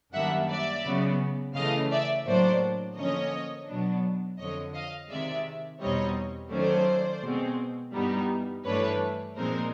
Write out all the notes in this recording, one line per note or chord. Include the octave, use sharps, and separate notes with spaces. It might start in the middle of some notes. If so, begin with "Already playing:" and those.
F#2 D#3 G3 A#3 D4 E5 F#5
D5 E5
C#3 F#3 B3
C#3 E3 A3 D#5 F5
D5 E5
A2 F#3 A#3 D4 C5 D5
D3 F3 A#3 C#4 C#5 D#5
B2 F#3 B3 D4
F2 D3 F3 C#5 D#5
D#5 F5
C3 D#3 G#3 D5 E5
E2 B2 G3 C4 D#4 C#5 D#5
D#3 F#3 A3 C#4 C5 D5
B2 G#3 C4
G2 E3 G3 B3 D#4
G2 E3 A3 D4 B4 C#5
A#2 F3 G#3 C4 D#4 A#4 C5